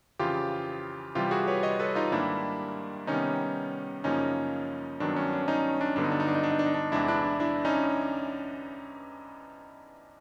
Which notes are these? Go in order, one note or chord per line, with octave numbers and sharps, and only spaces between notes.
F2 C#3 E3 F4 G4
C3 E3 G3 F4 G4
F#4 G#4
B4 C#5
C#5 D#5
A4 B4
D#4 F4
G#2 D#3 G3 A#3 D4 E4
C3 D#3 G3 B3 C#4 D#4
F#2 C#3 F3 A#3 C#4 D#4
G2 D#3 F#3 B3 D4
C#4
D4
C#4 D#4
D4
G2 D3 F#3 B3 D4
D#4
D4
D#4
D4
D#4
D4
D#4
D4
D#4
D4
E2 C3 E3 G#3 D4 E4
D4 E4
D4
D4 E4
C#4 D#4